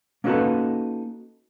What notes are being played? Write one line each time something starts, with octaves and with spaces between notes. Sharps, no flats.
A#3 C#4 D#4 F#4 A4 B4